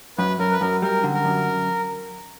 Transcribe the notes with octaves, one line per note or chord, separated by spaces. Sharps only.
F#2 B4
F#2 A#4
B4
F#2 A#4
G3 A#4
D3
A#4
F#2